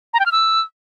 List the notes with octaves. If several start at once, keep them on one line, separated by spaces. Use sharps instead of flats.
A#5
G5
F6
E6